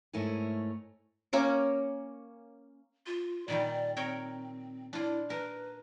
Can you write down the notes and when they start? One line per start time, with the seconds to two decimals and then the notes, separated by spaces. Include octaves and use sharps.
0.13 G#2 A3 E4 A#4 C#5 G#5
1.33 A#3 C#4 D6
3.07 F4
3.48 A#2 D#3 G3 D5
3.97 C4 A#4 C#5 G5
4.93 D4 E4 F4
5.30 A#4 B4